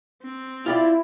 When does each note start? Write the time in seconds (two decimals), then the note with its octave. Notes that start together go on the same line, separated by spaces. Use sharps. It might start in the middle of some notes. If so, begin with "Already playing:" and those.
0.23 C4
0.66 E4 F4 G4 D5